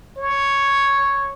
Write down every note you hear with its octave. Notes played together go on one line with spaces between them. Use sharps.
C#5